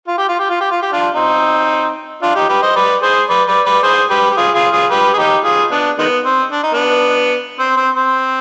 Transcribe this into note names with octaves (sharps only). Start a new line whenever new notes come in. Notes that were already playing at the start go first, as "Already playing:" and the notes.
F4
G4
F4
G4
F4
G4
F4
G4
D4 F4
C4 D#4
D4 F4
D#4 G4
G4 B4
C5 D#5
B4 D5
G#4 C5
B4 D5
B4 D5
B4 D5
G#4 C5
G4 B4
G4
F4 G#4
F4 G#4
F4 G#4
G4 B4
G#4
D#4 G4
F4 G#4
B3 D4
D#3 G#3 B3
C4
D4
D#4
B3 D4
C4
C4
C4